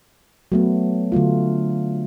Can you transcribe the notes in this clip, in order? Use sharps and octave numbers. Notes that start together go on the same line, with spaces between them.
F#3 A3 B3
D3 F#3 A3 F4